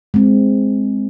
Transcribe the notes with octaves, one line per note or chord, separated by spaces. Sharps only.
G#3 C4